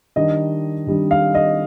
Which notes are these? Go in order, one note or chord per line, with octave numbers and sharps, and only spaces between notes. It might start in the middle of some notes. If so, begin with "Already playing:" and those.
D#3 G3 D4 D#5
D#3 G3 D4
F5
D#5